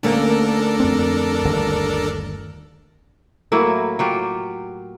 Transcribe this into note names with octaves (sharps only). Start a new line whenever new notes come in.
D2 A#3 C#4 D4 A4 A#4
F2 C4
G1 D#2
A2 F#3 A#3 E4
F#3 F4 G4